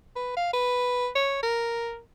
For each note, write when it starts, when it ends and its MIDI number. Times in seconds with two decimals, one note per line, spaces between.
0.16 0.33 71
0.37 0.49 77
0.53 1.08 71
1.15 1.40 73
1.43 1.99 70